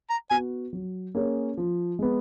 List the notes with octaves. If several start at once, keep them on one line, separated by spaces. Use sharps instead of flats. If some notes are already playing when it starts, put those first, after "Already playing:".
A#5
B3 F#4 G#5
F#3
A#3 C#4 G#4 C#5
F3
G#3 B3